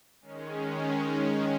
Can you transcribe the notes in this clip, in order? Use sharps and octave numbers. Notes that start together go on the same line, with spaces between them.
D#3 G#3 C#4